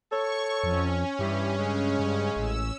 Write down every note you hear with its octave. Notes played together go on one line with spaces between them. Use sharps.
A4 C#5 C#6
F2 C#4
G2 E3 G4
C#3 G#3
G2
A1 E6